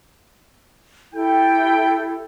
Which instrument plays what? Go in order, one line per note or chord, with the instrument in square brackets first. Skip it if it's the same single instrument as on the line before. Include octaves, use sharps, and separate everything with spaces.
[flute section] E4 G4 A4 [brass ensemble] G5